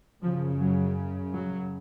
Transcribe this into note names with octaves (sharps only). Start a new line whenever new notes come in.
F#2 C#3 F3
F#3
F#3